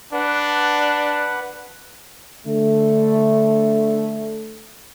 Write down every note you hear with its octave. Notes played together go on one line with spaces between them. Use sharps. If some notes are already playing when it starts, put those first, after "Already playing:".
D4 B4 F#5
D3 A3